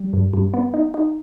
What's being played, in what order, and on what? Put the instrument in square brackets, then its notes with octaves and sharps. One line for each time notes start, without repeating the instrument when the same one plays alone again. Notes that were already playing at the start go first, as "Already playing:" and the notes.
Already playing: [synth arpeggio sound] G3
G2
G2
B3
D#4
D#4